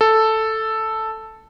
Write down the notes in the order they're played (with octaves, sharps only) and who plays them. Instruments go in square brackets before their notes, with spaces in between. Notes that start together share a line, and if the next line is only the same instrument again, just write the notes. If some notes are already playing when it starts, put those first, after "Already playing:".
[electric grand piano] A4